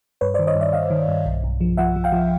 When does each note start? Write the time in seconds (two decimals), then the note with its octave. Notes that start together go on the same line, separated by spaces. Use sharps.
0.21 G2 B4 C#5
0.34 C5 D5
0.39 D#3
0.47 C#5 D#5
0.56 G2
0.61 D5 E5
0.73 G2 D#5 F5
0.90 D#3
1.08 G2
1.26 B1
1.44 B1
1.61 F3
1.77 F3 E5 F#5
1.96 F3
2.04 F5 G5
2.12 F3